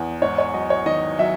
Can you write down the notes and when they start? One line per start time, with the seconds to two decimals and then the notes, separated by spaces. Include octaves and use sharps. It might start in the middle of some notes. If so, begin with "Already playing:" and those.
Already playing: E2
0.22 G#2 C#5
0.38 C#5
0.54 F#3 D#5
0.70 C#5
0.86 D#3 D#5
1.19 F#3 E5